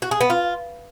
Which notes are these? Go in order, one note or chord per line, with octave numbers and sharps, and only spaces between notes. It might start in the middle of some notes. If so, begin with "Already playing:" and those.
F#4
G#4
B3
F4